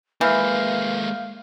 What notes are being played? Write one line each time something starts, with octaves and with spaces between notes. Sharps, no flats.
E3 G#3 A#3 E5 F5 F6 G6